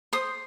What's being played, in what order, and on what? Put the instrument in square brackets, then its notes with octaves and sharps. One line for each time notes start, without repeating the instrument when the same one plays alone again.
[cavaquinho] C5 D#6